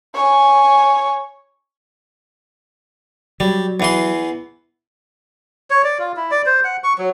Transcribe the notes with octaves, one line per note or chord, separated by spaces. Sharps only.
C#5 G#5
F#3 G3
E2 E3 C6
C#5
D5
F4
E4
D5
C5
F#5
C#6
F#3